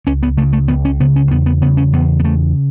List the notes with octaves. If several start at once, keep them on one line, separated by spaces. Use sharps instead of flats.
C#2 C#4
B3
C#3 A3
A3
C#2 B3
C#4
C#3 B3
C#4
E2 B3
B3
C#3 B3
C#4
E2 B3
B3
C#3 A3